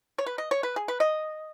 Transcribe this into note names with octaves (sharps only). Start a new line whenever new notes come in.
C#5
B4
D#5
C#5
B4
G#4
B4
D#5